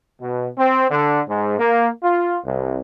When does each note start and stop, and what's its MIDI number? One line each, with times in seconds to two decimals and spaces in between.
0.21 0.48 47
0.58 0.87 60
0.91 1.21 50
1.28 1.55 44
1.59 1.88 58
2.04 2.39 65
2.45 2.80 36